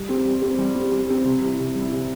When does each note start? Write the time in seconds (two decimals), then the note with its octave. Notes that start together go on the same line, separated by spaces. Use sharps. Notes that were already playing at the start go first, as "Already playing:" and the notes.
Already playing: G3
0.09 C4 G4
0.25 G3
0.42 C4 G4
0.58 G3
0.75 C4 G4
0.92 G3
1.09 C4 G4
1.25 C3
1.42 G3 E4
1.60 C3
1.75 G3 E4
1.92 C3